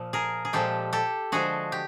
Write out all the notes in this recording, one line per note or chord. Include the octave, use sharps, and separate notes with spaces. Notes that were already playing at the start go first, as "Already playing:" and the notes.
Already playing: A#2 F3
G#4 A#4
G#4
A#2 F3 G#3 G4 A4
G4 A4
D3 F3 G#3 F#4 G#4
G4